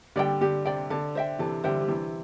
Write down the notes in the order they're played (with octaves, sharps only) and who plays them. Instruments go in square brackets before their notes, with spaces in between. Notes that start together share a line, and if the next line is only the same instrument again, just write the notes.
[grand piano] D3 G3 [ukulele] D5 G5
[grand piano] D3 [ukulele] G4
[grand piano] C3 [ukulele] D5 G5
[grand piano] D3 [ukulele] A4
[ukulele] C5 E5 G5
[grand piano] C3 E3 [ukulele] A4
[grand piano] D3 G3 [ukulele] C5 E5 G5
[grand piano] G3
[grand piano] C3 E3 [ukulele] D4